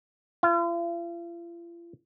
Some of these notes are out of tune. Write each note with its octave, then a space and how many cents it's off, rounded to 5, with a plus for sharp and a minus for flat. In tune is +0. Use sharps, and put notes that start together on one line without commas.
F4 -45